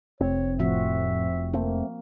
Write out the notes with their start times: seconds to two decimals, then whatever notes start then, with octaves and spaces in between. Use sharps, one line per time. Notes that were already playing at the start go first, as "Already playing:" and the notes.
0.21 F1 C4 C#5
0.59 A2 F3 C4 F#4 E5
1.54 A3 A#3 C4